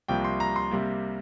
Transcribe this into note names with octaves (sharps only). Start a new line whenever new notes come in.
C2 C3 F3 A#3 G5
C6
A#5
C6
C3 G3 A#3